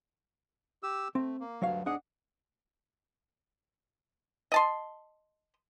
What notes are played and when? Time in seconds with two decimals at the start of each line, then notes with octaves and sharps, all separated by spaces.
0.83 G4 E6
1.15 A3 C4
1.40 A#3
1.62 D2 G2 F#3 C#5 F5
1.86 G#2 D4 G#4 D#5 F#5
4.52 D#5 A5 C6